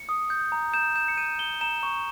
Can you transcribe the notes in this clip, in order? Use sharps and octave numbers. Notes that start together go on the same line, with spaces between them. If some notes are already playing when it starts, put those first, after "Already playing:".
Already playing: C#7
D#6
G6
A#5
G6 E7
G6 E7
C#7
G6 D#7
G6 G7
A#5 E7
C#6